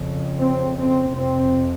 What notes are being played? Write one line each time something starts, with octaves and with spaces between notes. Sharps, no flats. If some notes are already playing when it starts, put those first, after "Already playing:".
Already playing: F2 C#3
C4
C4
F2 C3 C4